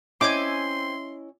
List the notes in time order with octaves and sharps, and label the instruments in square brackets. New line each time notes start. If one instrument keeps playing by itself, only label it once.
[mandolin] C4 E5 G#5 [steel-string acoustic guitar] C#4 E4 D#5 [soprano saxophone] C6 [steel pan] D6